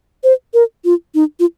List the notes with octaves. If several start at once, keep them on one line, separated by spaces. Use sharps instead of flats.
C5
A#4
F4
D#4
F4